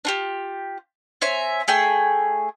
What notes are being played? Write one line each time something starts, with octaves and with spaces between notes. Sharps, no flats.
D4 F4 G4
C4 C#5 E5 G#5
A3 G#4 G5 G#5